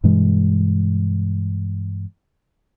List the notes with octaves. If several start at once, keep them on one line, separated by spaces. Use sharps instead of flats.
G2 B2 E3 G#3